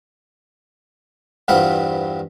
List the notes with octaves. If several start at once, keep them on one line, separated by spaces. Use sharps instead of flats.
E2 G2 C4 F4 F#5 B5